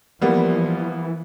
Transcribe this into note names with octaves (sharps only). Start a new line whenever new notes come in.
E3 F3 G3 A#3 B3